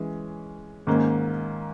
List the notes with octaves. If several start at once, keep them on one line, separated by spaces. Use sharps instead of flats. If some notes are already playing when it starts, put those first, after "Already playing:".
Already playing: E3 G#3 C#4
G#2 D#3 A#3 C#4